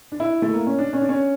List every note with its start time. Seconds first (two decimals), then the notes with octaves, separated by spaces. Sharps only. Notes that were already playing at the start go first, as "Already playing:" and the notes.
0.12 D4
0.20 E4
0.42 A3
0.53 A#3
0.66 C#4
0.79 D4
0.93 C#4
1.02 D4
1.09 C#4